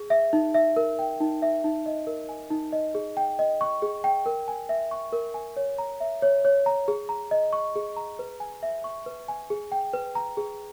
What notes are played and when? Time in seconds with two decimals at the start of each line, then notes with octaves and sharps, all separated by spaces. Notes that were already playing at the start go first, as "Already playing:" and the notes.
Already playing: G#4
0.10 E5
0.33 D#4
0.54 E5
0.76 A#4
0.99 G5
1.20 D#4
1.42 E5
1.64 D#4
1.86 D#5
2.07 A#4
2.29 G#5
2.50 D#4
2.72 D#5
2.95 G#4
3.17 G5
3.39 D#5
3.61 C#6
3.82 G#4
4.04 G5
4.26 A#4
4.48 G#5
4.69 E5
4.91 C#6
5.12 A#4
5.34 G#5
5.56 C#5
5.78 A#5
6.00 E5
6.22 C#5
6.45 C#5
6.66 A#5
6.88 G#4
7.09 A#5
7.31 D#5
7.53 C#6
7.76 G#4
7.96 A#5
8.19 B4
8.40 G#5
8.63 E5
8.84 C#6
9.06 B4
9.28 G#5
9.50 G#4
9.72 G5
9.93 B4
10.15 A#5
10.37 G#4